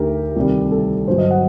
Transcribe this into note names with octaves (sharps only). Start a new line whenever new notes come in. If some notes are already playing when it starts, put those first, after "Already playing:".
Already playing: D2 D3 A3 D#4 G4 A#4
C2 C3 D#3 G3
A4
G2 D3 F#3 C5
D#5
F#5